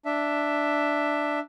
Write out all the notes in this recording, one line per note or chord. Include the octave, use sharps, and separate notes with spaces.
D4 E5